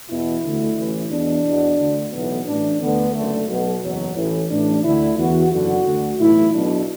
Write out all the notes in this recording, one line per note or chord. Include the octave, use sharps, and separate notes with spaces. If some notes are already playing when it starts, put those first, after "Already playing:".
E2 B2 E4
D2 D3
A1 A2 E3
E2 B2 D4
E2 B2
D2 D3
B1 A2 E3 B3
A1 A2 E3 D4
D2 D3 B3
F#1 F#2 D3 A3
B1 B2
F#1 E2 B2 F#3
A1 A2 E3
A1 A2 E3 D4
D2 D3 E4
E2 E3 F#4
F#1 F#2 D3 F#4
D2 D3
B1 A2 E3 E4
B1 B2 D4